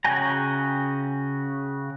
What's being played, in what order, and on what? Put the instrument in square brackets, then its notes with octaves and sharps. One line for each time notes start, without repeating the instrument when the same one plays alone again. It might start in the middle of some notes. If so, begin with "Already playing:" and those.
[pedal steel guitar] C#3 F#4 G5 G#5 A#5